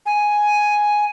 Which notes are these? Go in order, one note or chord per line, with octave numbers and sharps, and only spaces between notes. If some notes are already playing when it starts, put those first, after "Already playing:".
G#5